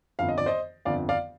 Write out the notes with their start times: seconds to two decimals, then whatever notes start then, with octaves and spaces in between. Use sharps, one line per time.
0.19 G1 F2 D3 F5
0.29 D#5
0.38 D5
0.46 C5 D#5
0.85 G1 F2 D3 D5 F5
1.09 D5 F5